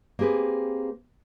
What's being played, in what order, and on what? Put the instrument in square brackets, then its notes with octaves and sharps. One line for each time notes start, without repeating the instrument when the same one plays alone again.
[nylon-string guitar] A#3 C4 G4 G#4 B4